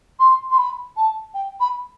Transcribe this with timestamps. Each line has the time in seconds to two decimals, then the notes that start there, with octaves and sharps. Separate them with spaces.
0.19 C6
0.50 C6
0.57 B5
0.96 A5
1.34 G5
1.60 B5